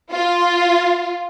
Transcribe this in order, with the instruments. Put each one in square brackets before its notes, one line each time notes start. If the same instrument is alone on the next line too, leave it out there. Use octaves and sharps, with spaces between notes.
[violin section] F4